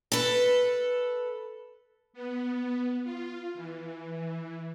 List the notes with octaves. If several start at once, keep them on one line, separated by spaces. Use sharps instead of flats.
A4 B4
B3
F4
E3